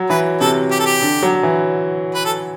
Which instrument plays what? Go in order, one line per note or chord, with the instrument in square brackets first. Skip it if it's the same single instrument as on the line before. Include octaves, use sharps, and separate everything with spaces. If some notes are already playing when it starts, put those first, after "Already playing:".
Already playing: [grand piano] F#3
[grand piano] E3 [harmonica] B4
[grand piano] C3 [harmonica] A4
[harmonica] G4
A4
G4
[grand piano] D3
F#3
E3
[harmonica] B4
A4